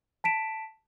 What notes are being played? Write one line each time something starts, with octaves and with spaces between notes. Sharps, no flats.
A5 B6 D7 E7